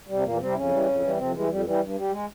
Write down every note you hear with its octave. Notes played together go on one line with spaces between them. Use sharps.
C3 G3
E2 A#2 A#3
C3 G3 C4
E4
F2 C#3 C#4
E3 G3
F2
E3 G3
F2 C3 C4
E3 G3 G#3
F2 G3
E3 G3
G2
G3
G#3